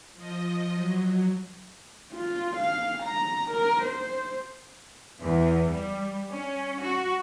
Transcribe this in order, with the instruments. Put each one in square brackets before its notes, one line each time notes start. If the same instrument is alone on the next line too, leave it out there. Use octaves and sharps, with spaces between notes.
[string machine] F3 D#5
F#3
[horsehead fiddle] F4
F5
A#5
A#4
C5
[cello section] E2
G3
C#4
F#4